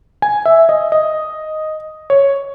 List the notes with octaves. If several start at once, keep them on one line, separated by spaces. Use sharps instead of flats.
G#5
E5
D#5
D#5
C#5